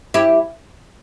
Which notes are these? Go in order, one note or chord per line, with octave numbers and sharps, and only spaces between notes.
E4 G4